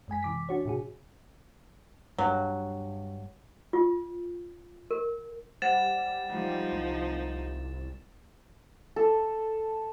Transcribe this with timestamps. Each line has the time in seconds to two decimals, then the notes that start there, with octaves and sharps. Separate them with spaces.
0.08 F#2 G#3 G#5 B6
0.23 C3 E3 D6 B6
0.49 D4 F#4 C#5
0.65 A2 C3 F#4 G#4
2.18 G2 F#3
3.73 F4
4.91 A#4
5.62 G3 C5 F#5 A6 E7
6.29 F3 D#4
6.73 C2
8.96 A4